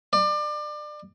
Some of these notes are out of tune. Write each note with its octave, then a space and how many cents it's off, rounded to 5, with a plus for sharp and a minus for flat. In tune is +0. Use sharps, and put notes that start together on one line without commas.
D5 +30